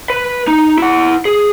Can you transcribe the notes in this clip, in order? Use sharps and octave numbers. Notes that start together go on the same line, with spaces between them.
B4
D#4
E4 F#5
G#4